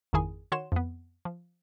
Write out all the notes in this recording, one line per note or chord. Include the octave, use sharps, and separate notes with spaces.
G#1 F2 D#3 E4 G#4 G#5
D#3 F#4 C#5 F#5 C6 E7
F2 B3
F3